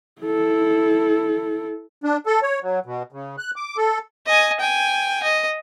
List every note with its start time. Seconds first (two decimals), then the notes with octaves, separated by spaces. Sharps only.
0.22 E4 A4
2.04 D4
2.26 A4
2.42 C#5
2.62 F#3
2.86 B2
3.12 C#3
3.38 F#6
3.56 D6
3.77 A4
4.27 D#5 G#5
4.60 G5 G#5
5.23 D#5